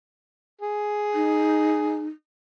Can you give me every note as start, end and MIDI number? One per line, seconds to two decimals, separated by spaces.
0.61 2.04 68
1.14 2.07 63